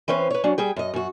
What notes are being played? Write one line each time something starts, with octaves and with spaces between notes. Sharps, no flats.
E3 C4 C#4 B4 C5
B4 C#5
F#3 C#4 D4
G3 G#4 G5
F#2 D#5
F#2 F#4